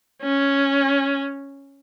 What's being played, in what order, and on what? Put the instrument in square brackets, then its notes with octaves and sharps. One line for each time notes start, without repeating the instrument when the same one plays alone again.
[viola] C#4